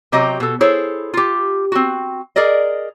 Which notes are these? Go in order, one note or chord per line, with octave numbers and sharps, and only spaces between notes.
C3 F#3 G4 D#5 A#5
B2 A4
E4 G#4 A4 C5 C#5
F4 G4
C4 F#4
G#4 A#4 D5 D#5